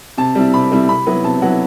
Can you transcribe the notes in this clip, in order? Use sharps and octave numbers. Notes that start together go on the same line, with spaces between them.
C3 A5
G3 C4 E4
C3 B5
G3 C4 E4
C3 B5
F#3 B3 E4
C3 A5
F#3 B3 E4 F#5